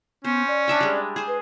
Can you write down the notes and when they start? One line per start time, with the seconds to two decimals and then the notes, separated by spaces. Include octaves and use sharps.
0.24 B3 C#4 C5
0.48 D5
0.68 D4 E5 G5
0.81 G3 G#3
1.16 G#4 C5
1.28 B4